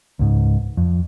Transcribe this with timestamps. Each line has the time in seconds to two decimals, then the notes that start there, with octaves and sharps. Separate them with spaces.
0.19 C#2 G#2
0.77 F2